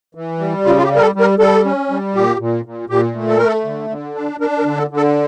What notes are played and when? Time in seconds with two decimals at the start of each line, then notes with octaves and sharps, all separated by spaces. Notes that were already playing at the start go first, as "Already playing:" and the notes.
0.15 E3
0.39 G3
0.65 C#3 F4
0.78 F4
0.84 G4
0.89 G3
0.96 A#4
1.02 A4
1.15 G3
1.20 A#4
1.39 G3 A4
1.65 C#4
1.90 G3
2.15 A#2 G4
2.39 A#2
2.65 A#2
2.89 A#2 G4
3.15 A3
3.27 A4
3.37 A3 A#4
3.47 A4
3.65 D3
3.90 D3
4.15 D4
4.40 D4 A#4
4.59 A#4
4.64 D3
4.78 A4
4.90 D3
4.97 A4